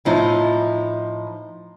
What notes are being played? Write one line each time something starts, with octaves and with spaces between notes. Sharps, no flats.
A2 F3 D#4 E4